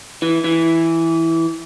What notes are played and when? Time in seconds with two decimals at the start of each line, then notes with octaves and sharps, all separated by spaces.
0.22 E3
0.44 E3